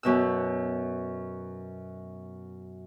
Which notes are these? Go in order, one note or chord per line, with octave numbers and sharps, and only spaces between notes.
F#2 B2 E6